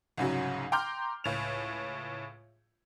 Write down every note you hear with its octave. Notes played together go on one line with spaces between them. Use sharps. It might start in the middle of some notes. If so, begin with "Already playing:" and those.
C2 G#2 C#3 F#3
G5 A#5 C6 D6 F6 G6
C#2 A2 F7